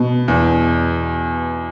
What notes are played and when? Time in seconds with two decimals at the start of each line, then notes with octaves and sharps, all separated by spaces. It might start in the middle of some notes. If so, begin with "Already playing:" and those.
Already playing: B2
0.28 E2